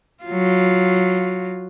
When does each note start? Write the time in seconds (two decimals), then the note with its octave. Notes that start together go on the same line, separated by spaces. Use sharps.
0.24 F#3 F4